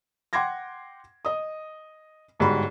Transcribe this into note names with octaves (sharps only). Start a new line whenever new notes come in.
F#5 G5 C6 D6 G#6 A#6
D#5 D#6
G1 G#2 G3 F#4 B5